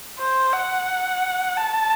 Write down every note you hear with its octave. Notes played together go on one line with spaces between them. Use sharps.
C5
F#5
A5